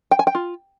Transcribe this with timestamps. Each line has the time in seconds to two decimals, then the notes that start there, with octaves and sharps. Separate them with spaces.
0.11 G5
0.19 G#5
0.27 G5
0.35 F4